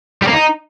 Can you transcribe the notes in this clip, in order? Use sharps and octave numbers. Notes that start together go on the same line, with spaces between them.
G3
A#3
D#4